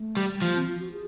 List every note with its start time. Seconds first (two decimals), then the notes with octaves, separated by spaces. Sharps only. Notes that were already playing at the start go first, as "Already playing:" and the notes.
Already playing: A3
0.17 G3
0.42 F3 A#3
0.54 C4
0.67 F4
0.80 F#4
0.92 G#4